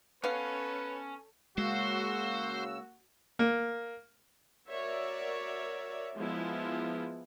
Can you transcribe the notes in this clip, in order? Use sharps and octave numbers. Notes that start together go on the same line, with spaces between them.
B3 C#4 A4 B4 C#5 F5
C#3 G#3 A#3 F#4 C5 E6
A#3
F#4 A#4 C#5 D5 E5
F3 G#3 B3 E4